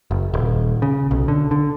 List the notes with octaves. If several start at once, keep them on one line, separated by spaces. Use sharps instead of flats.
F#1
D#1
C#3
B1
D3
D3